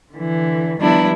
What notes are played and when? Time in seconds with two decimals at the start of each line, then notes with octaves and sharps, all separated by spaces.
0.14 D3 E3
0.80 D#3 F3 G3 B3 D4 E4